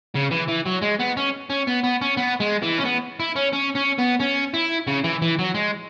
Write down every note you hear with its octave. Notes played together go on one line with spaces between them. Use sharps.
C#3
E3
E3
F#3
G#3
B3
C#4
C#4
B3
B3
C#4
B3
G#3
E3
C#4
B3
E4
C#4
C#4
C#4
B3
C#4
E4
C#3
E3
E3
F#3
G#3